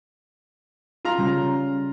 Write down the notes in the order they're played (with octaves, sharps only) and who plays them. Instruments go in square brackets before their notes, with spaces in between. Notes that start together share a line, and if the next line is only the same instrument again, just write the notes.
[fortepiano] F4 A#5
[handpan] C#3 G3 C#4